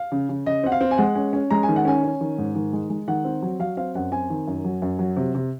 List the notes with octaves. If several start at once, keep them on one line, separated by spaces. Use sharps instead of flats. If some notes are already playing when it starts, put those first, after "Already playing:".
Already playing: F5
C#3
C#3
C#3 D#5
C4 F#5
F5
C4
G#5
G#3 F#5
C#4
C#4
G#3 A#5
G#5
D#3
F#5
C#4 G#5
C#4
D#3
G#2
D#3
G#3
G#3
D#3 F#5
C4
F#3
F#3 F5
C4 F5
F#2 F#5
C4 G#5
D#3
F#2
F#3
F#2
F#3
C3
C3